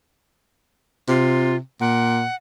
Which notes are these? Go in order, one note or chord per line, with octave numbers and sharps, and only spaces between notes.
C3 F4
A#2 F#5